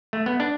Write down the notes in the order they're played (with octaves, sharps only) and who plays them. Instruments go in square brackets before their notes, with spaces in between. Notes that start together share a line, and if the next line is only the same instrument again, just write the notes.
[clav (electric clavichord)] A3
B3
D4